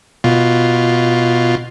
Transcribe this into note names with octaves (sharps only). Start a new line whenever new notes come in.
B2 F4